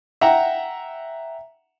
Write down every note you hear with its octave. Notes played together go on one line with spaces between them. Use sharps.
E5 F#5 G5 A#5